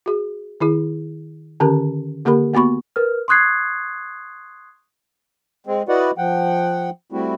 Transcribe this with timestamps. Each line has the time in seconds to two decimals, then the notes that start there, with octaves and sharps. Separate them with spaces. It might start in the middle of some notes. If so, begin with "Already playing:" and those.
0.06 F#4 G#4
0.60 D#3 E4 G#4
1.60 D3 D#3 C#4 G4 A#4
2.25 D3 A#3 G4 A#4 B5
2.54 A#3 B3 F#4 B5 C#6
2.96 A#4 B4 F6
3.28 C6 C#6 D#6 F#6 G#6 C7
5.67 G#3 C4
5.88 E4 F#4 B4 D5 D#5 F#5
6.18 F3 F#5 G5
7.12 G3 A3 C4 E4 F#4